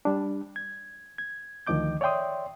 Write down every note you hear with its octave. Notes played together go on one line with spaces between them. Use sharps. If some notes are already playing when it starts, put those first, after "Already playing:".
G3 D4
G#6
G#6
D2 D#3 F3 D#5 D6 G6
C#5 D5 E5 G5 C6 D#6